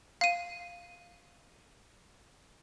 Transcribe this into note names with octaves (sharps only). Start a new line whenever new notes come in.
F5 D#7